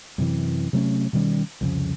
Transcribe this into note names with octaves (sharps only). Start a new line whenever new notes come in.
F#2 C3 E3
C3 F#3 A3 C#4
B2 D#3 G3 C#4
C2 F2 C#3